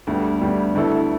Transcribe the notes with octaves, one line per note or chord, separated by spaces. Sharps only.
D2 D3 G3 B3 G4
D2 D3 G3 B3 G4
D2 D3 B3 E4 A4